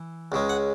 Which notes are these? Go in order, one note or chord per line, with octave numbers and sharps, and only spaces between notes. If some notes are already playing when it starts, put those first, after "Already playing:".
Already playing: E3
C#2 C#3 G#3
F#5